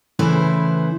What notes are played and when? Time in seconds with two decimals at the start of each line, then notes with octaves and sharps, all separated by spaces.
0.19 C#3 E3 A3 E4 B4 C5